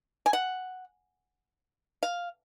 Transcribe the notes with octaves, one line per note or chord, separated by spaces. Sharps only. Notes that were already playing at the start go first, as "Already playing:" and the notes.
G#5
F#5
F5